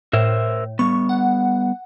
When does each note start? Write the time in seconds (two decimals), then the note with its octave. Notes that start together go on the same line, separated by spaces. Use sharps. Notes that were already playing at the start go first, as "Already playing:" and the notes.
0.13 A2 A#4 C5 E5
0.79 G3 B3 C#6
1.09 F#5